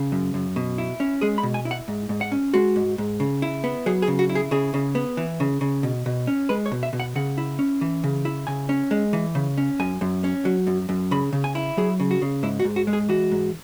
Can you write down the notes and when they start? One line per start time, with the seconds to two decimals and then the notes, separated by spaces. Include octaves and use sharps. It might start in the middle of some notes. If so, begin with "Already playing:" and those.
Already playing: C#3
0.12 F#2
0.34 F#2
0.56 B2
0.78 E4
1.00 C#4
1.21 G#3 G#4
1.38 B5
1.43 B2
1.54 G#5
1.65 E4
1.71 F#5
1.88 G#2
2.09 G#2
2.21 F#5
2.32 C#4
2.54 G#3 F#4
2.76 G#2
2.98 G#2
3.20 C#3
3.42 E4
3.64 B3
3.86 F#3 G#4
4.02 G#4
4.08 C#3
4.19 F#4
4.29 E4
4.35 G#4
4.51 C#3 G#4
4.74 C#3
4.95 B3
5.17 E3
5.40 C#3
5.61 C#3
5.83 B2
6.06 B2
6.27 C#4
6.49 G#3 B4
6.66 C#5
6.72 B2
6.83 E5
6.93 B2
7.00 F#5
7.16 C#3 F#5
7.38 E4
7.59 C#4
7.81 E3
8.04 C#3
8.25 E4
8.47 C#3 G#5
8.69 C#4
8.91 G#3
9.13 E3
9.35 C#3
9.58 C#4
9.79 F#2 G#5
10.01 F#2
10.24 C#4
10.45 F#3
10.67 F#2
10.89 F#2
11.11 C#3 B5
11.33 C#3
11.44 G#5
11.55 E4
11.77 F#3 G#4
12.00 C#3
12.11 F#4
12.22 C#3
12.43 G#2 E4
12.60 F#4
12.64 G#2
12.76 F#4
12.87 G#3
12.93 G#4
13.09 E3 F#4
13.32 G#2